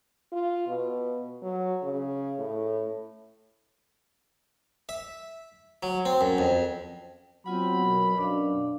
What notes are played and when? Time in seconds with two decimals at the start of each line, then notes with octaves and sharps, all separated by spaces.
0.32 F4
0.67 B2
1.42 F#3
1.83 C#3
2.39 A2
4.89 E5
5.83 F#3
6.05 C4
6.21 F#2
6.38 F2
7.46 F#3 B3 C4 F4 F#5 B5
7.85 B2 A#4
8.18 F#2 D4 D5 F5